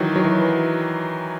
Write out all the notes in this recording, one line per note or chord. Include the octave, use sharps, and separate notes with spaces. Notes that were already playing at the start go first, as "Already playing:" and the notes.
Already playing: D#3 E3 F#3
F#3
E3